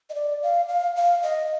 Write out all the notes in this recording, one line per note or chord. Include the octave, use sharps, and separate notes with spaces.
D#5
D5
F5
F5
F5
D#5